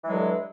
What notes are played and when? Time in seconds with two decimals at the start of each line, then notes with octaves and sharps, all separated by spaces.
0.03 E3
0.05 F#3
0.08 G#3
0.11 D3
0.13 G2